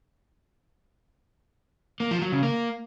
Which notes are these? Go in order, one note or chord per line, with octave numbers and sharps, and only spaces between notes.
A#3
F3
F#3
C#3
A#3